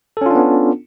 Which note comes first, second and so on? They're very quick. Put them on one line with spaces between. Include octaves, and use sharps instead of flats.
A4 C#4 F4 D4 B3